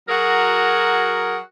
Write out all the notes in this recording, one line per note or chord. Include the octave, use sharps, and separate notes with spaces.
F#3 F#4 G#4 A#4